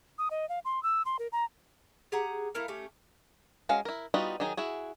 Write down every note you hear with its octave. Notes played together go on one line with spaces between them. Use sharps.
D#6
D#5
F5
C6
E6
C6
A#4
A#5
G4 G#4 F#5 A#5
A3 E4 A#4 F5
A3 C#4 G4
G#3 C#4 F#4 F5
E4 A#4
G3 B3 D#4 F4 F#4
D#3 F#3 D#4 G#4
E4 F#4 G#4